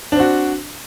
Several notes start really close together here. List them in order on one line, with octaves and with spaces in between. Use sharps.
D4 C4 F#4